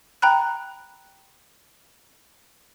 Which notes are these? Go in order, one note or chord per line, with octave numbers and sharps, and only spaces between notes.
G5 A#5 B5 F#6